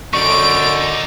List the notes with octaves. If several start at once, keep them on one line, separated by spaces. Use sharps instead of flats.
F#2 D3 D#4 D5 C#6 D7